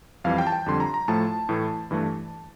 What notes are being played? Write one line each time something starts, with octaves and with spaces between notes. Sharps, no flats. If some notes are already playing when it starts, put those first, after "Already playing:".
F2 E3 G3 F5
G5
A5
G5
F2 D3 G3 C6
A#5
A#5
A2 F3 A3 A5
A2 E3 A3
G2 E3 A3